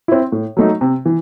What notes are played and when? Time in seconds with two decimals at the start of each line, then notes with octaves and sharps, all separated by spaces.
0.08 C4 E4
0.32 A2
0.57 F#3 A3 D#4
0.81 C3
1.06 E3